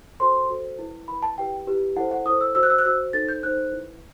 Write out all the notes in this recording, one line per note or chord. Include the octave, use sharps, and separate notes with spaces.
F#4 A4 C5 C6
F#4 A4 C5
E4 B4
E4 B4 B5
A5
E4 G4 B4 G5
E4 G4 B4
E4 A4 C5 F#5
F#5
E4 A4 C5 D#6
E6
F#4 C5 E6
F#6
E6
F#6
F#4 C5 E6
D#4 A4 C5 A6
G6
D#4 A4 C5 F#6
E4 B4